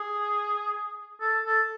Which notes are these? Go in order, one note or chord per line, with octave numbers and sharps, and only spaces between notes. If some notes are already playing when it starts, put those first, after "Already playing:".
Already playing: G#4
A4
A4